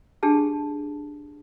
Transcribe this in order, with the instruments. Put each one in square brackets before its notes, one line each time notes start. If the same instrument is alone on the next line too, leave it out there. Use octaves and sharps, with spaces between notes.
[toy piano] D4 G4 G#4 A5